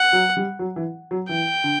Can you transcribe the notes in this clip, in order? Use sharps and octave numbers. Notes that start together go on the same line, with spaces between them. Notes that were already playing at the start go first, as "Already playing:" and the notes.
Already playing: F#5
F#3
G3
F#3
E3
F#3
E3 G5
D3